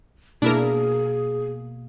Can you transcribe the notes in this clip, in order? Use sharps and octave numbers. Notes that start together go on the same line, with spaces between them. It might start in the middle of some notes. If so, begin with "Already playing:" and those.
B2 A#3 D4 E4 G#4 A#4